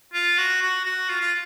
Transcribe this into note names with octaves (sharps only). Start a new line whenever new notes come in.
F4
F#4
F#4
F#4
F4
F4